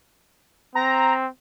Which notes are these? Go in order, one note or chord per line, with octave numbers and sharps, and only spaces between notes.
C4 A#5